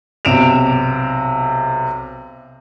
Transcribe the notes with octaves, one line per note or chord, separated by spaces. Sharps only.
B1 C3 D7 E7 F7